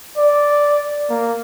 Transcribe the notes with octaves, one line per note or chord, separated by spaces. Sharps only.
D5
A#3